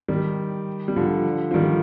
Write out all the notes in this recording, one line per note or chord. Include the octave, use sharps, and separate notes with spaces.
D#3 G3
G3
D3 F3
F3
D#3 G3